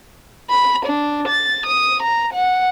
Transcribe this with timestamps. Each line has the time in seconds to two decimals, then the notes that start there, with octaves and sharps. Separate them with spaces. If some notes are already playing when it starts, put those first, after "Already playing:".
0.50 B5
0.86 D4
1.28 A6
1.66 D#6
2.02 A#5
2.33 F#5